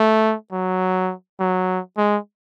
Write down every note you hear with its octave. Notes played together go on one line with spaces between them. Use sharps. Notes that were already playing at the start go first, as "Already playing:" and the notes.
Already playing: A3
F#3
F#3
G#3